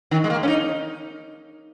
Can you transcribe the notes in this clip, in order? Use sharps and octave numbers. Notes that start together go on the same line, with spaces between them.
D#3
G#3
A#3
C#4
D#4